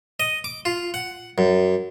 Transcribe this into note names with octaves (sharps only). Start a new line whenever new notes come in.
D#5
D6
F4
F#5
F#2